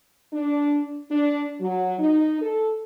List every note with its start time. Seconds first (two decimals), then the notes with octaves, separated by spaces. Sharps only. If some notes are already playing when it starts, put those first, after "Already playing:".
0.33 D4
1.10 D4
1.60 F#3
1.99 D#4
2.42 A4